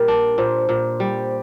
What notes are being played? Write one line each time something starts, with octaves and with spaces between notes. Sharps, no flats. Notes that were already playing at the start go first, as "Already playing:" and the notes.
Already playing: A#2 G3 A#4
D4
A#2 C5
A#2
G3